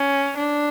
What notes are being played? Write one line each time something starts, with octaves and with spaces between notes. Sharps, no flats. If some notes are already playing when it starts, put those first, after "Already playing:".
Already playing: C#4
D4